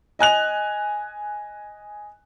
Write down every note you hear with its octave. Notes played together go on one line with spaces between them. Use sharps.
D#5 G#5 F#6 F7